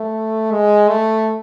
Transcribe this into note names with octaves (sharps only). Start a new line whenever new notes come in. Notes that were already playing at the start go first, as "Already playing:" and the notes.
Already playing: A3
G#3
A3